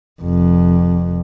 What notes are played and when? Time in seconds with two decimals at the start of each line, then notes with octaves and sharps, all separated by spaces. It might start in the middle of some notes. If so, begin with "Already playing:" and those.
0.22 F1 F2